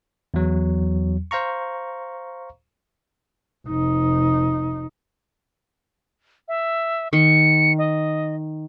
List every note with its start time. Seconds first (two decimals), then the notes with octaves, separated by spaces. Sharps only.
0.34 E2 F#3
1.31 C5 F5 A#5 C#6
3.67 F1 D#4
6.48 E5
7.13 D#3 C#7
7.78 D#5